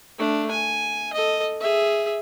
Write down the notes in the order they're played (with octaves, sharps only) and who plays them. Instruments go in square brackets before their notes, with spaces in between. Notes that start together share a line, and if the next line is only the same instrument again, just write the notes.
[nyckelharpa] A3 D4
G#5
A4 D#5
G#4 E5